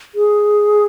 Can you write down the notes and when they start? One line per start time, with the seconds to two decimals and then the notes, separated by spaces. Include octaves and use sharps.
0.15 G#4